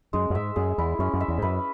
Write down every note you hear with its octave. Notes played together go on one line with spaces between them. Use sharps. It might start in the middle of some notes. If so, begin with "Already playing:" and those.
F#2 G#3
F#2
G#2 E5
F#2 G#4
E2 E4
F#2 C#4
F#2
E5
E2
G#2
F#2 B4